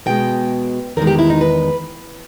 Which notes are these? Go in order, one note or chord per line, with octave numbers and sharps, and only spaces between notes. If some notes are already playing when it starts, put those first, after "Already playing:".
B2 G#3 G5
E2 D#3 G#3 A#4
G4
E4
D#4
B4